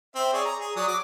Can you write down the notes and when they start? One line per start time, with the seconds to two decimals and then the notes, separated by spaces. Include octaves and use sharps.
0.15 C4 E5
0.33 G#4 C#5 D5
0.45 A#5
0.60 G#4
0.76 F#3 D5 D#6
0.88 F#3 D6